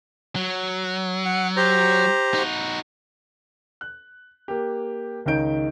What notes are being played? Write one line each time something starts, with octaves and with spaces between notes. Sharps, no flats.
F#3
F#5
G4 C5 A#5
D#4 F#4
F#6
A#3 G4
C#2 D#3 C#4 D#4 G6 D7